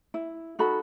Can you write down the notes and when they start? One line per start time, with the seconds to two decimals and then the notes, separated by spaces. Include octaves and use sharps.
0.14 E4
0.59 D#4 F#4 A4 B5